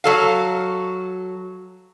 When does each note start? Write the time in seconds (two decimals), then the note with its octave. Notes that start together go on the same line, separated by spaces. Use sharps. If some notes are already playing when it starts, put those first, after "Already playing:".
0.04 F#3 A4 F5